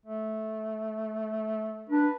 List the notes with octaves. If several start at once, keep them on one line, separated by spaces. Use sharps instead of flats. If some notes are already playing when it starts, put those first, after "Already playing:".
A3
D4 B4